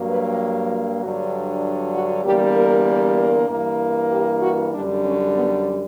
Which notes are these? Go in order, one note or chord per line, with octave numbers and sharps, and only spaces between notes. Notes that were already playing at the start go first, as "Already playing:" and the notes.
Already playing: G2 F#3 A#3
B4
G2 D3 F#3
F#4
E2 D3 G3 A#3 G4
A#4
A#4
G2 E3 A#3
G4
F#4
F#2 D3 G3 D4
C#4
B3